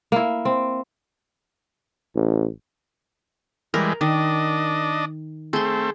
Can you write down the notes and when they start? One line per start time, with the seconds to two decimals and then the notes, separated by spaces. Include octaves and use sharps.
0.12 A#3 E4
0.45 C4
2.15 A1
3.74 E3 G3 G#3 A#4
4.01 D#3 D4 D#5
5.53 A3 C4 G#4 C6